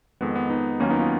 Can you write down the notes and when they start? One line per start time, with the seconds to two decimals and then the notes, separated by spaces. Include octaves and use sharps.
0.21 F2 D#3 G#3 B3
0.35 B3
0.50 B3 D#4
0.80 D#2 D#3 F#3 A#3 C#4
0.90 B3 D#4
1.00 C#4 F4